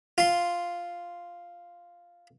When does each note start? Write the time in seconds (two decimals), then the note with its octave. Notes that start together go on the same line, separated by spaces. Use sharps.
0.18 F4 C6